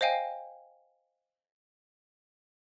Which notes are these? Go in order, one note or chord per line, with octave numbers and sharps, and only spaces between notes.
C5 D#5 F5 G5 G#5